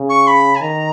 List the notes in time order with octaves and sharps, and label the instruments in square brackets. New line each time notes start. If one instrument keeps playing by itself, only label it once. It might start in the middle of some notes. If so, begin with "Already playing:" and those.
Already playing: [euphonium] C#3
[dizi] C#6
B5
G#5
[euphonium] D#3 [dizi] A#5